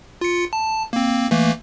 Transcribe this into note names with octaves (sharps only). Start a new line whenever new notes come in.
F4 C#7
A5
A#3 C4
E3 A3 A#3